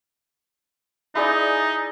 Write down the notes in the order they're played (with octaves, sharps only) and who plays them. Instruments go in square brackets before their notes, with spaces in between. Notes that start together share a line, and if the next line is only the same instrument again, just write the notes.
[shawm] D#4 [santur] E4 G#4 D5